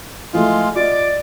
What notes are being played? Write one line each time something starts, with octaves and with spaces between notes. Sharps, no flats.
E3 F3 G#3 A3 F4
F4 D5 D#5 D6